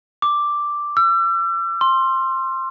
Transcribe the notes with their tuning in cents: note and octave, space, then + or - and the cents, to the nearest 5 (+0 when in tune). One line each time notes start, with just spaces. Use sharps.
D6 +0
E6 +45
C6 +15